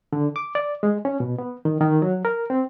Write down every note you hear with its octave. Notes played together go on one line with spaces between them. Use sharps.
D3
D6
D5
G#3
C#4
B2
B3
D#3
D#3
F#3
A#4
C4